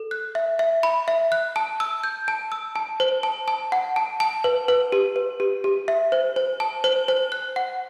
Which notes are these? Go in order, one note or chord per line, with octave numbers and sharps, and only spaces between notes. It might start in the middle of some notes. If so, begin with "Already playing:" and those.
Already playing: A4
F#6
E5
E5
B5
E5
F#6
A5
E6
G6
A5
E6
A5
C5
A5
A5
F#5
A5
A5
B4
B4
G4
B4
G4
G4
E5
C5
C5
A5
C5
C5
F#6
F#5